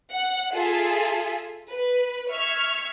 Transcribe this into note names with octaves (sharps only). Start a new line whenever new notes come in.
F#5
F4 G#4 A4 E5
B4
E5 C#6 F6 G#6